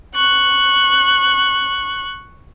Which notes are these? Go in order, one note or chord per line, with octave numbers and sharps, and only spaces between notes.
C#6 F#6